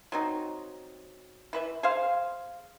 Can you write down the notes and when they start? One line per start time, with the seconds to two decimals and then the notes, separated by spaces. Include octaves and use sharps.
0.12 F#3 C4 D#4
1.53 E3 B4 E5
1.83 G#4 C5 F5